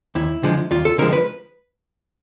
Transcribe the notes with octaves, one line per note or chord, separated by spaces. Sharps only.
D#2 E4
D3 F3 G#3
D#2 F4
A4
D3 F3 G#3 A#4
B4